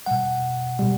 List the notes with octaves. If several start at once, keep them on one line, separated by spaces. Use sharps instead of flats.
B2 G3 F#5
B2 G3